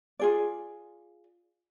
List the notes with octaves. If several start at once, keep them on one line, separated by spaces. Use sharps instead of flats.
F4 G#4 D5